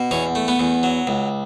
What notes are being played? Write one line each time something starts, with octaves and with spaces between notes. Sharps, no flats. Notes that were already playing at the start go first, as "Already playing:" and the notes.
Already playing: B2
E2 C#4
A3
B3
E2
F#3
C#2